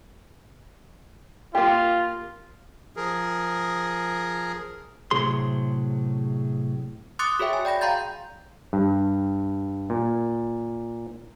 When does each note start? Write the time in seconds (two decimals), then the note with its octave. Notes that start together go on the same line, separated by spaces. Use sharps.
1.55 A#3 F4 G4
2.97 F3 G#4 A#4
5.11 A2 C3 F#3 G#4 C6
7.19 C6 D6 D#6 F#6 A6 C#7
7.39 F#4 G#4 C#5 E5 G5
7.53 G#5
7.65 D5 G5 B5 A#6
7.81 F5 G5 A#5 C6 G6 A6
8.73 G2
9.90 A#2